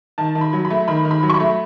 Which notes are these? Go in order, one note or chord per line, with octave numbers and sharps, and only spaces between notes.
D#3 A5
D#3
B5
F#3
B5
A3
D#3 B5
D#3
B5
F#3
C#6
B5
A3